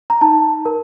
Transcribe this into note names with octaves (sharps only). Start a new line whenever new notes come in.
A#5
D#4 A5
A#4